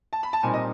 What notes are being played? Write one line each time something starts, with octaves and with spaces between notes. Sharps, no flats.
A5
B5
A5
A#2 G3 C4 D#4 G#5
D#5